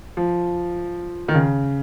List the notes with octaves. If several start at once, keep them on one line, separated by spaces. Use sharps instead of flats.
F3
D#3
C#3